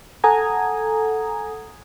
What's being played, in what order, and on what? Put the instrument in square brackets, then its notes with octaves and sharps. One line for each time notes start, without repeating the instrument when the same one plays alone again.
[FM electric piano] A4 F#5 G#5 A#5 D#6 G#6